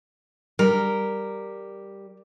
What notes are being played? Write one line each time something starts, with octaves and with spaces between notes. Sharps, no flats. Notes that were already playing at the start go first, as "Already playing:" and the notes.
G3 A#4